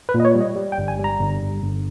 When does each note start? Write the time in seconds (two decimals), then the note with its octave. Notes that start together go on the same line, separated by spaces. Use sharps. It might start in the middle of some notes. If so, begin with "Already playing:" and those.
0.09 B4
0.14 A#2
0.20 D#5
0.25 C#5
0.35 G3
0.41 D#5
0.56 G3
0.72 G5
0.78 G1
0.88 G#5
0.99 G3
1.04 A#5
1.19 G1
1.41 G1
1.62 G1